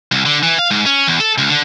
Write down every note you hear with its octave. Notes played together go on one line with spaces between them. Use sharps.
C2
D3
E3
F5
G#2
C#4
E2
A4
C#2
D3